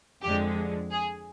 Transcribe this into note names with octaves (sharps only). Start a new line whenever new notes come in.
F2 D3 G#3 G4
G#4